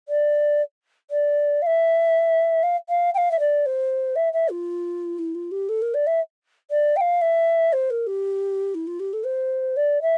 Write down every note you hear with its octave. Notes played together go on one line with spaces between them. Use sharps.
D5
D5
F5
E5
F5
F5
G5
F5
E5
D5
C5
E5
E5
F4
E4
F4
G4
A4
A#4
D5
E5
D5
G5
F5
E5
C5
A#4
G4
E4
F4
G4
A4
C5
D5
E5